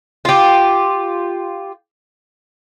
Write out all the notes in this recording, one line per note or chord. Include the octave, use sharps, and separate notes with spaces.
F4 G4